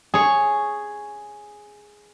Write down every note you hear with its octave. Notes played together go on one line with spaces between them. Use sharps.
G#4 C#5